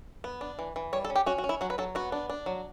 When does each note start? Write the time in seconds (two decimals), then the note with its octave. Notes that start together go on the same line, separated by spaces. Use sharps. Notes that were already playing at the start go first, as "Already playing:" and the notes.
0.24 B3
0.41 D4
0.59 E3
0.76 E3
0.93 G3 C#5
1.05 A4
1.10 C#4
1.16 G4
1.26 C#4 F#4
1.38 F#4
1.44 C#4
1.49 E4
1.61 F#3 F#4
1.70 B4
1.78 F#3 A4
1.95 B3 F#4
2.12 D4
2.30 D4
2.46 F#3